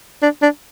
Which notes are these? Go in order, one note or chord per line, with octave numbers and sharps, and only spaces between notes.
D4
D4